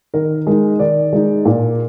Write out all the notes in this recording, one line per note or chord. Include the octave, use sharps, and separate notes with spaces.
D#3 A#4
G#3 D#4 A#4
D#3 D5
G#3 D#4
A#2